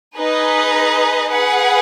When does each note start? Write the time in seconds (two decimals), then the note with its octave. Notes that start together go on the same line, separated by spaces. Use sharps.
0.17 D#4 G#4 B4 D#5
1.30 G#4 B4 F#5